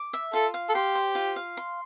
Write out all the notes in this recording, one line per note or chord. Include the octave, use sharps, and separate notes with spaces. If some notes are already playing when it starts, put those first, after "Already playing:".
Already playing: D6
E5
F4 A4
F5
A4
G4 C6
C5
F4
F5
C6